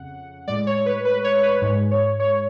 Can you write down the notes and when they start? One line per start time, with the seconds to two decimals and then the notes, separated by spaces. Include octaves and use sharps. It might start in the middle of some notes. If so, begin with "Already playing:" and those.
Already playing: F2 C#3 F#5
0.47 A2 G#3 D5
0.67 C#5
0.77 C#5
0.86 B4
1.05 B4
1.24 C#5
1.43 B4
1.62 G#2 G#3 C#5
1.91 C#5
2.20 C#5